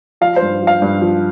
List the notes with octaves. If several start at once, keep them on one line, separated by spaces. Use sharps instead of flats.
F3 F5
C5
G2
F3
F5
G2
F3